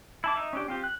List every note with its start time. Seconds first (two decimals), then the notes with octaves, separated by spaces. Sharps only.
0.24 E4 A5 D6
0.36 D#4 E5
0.53 C#4 D4 G4
0.68 C4 F4 G4
0.84 F#6